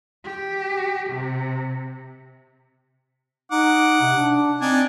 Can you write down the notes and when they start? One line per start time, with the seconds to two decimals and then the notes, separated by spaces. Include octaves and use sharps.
0.24 G4
1.10 C3
3.52 D#4 F#5 D6
4.01 C3
4.17 D4
4.61 C4 D4 D#4 G#5